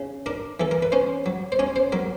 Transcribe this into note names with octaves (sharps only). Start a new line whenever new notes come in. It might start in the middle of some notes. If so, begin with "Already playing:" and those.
Already playing: C#3
D4 A#4
E3 A4
A#4
B4
C#4 C5
F#3
C5
C#4 C#5
C5
F#3 A#4